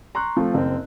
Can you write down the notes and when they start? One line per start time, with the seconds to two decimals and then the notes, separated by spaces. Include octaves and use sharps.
0.15 A#5 C6 C#6 F#6
0.37 F3 A3 C4
0.54 F#1 C4